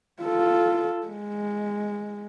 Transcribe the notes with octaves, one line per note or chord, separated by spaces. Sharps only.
F4 A4
G#3